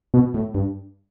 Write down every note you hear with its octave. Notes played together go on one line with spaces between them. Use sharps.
B2
A2
G2